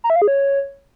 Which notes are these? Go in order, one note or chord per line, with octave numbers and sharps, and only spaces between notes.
A#5
E5
F5
G#4
C#5